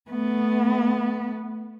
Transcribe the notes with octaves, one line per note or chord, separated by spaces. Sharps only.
A3 B3